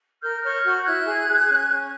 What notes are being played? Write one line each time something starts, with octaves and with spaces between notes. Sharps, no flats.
A#4 F6 G6
C#5 F6 G6
F#4 F6 G6
E4 F#6 G#6
G#4
G#4
C#4
C#4